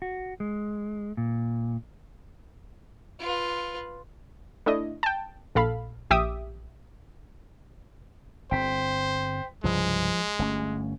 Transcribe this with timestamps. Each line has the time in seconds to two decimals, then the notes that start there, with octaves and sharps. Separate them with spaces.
0.02 F#4
0.40 G#3
1.17 A#2
3.20 F4 B4
4.66 A3 D4 E4 D#5
5.03 G5 A5
5.55 A#1 A4 F5 B5
6.10 A#1 G4 E5 D6 D#6
8.51 G1 C4 C5 G5 B6
9.64 C2 G2 C#3 F3 G#3
10.39 G1 A3 C#4